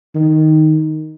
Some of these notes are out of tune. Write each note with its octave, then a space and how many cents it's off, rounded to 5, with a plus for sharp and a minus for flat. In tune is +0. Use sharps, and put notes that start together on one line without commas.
D#3 +0